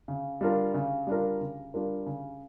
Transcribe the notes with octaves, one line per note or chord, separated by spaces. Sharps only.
C#3
G3 D4 F4 A#4
C#3
G3 D4 F4 A#4
C#3
G3 D4 F4 A#4
C#3